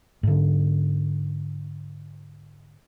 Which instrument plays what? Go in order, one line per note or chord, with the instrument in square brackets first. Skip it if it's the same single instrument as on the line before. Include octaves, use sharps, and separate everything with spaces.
[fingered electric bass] G#2 D3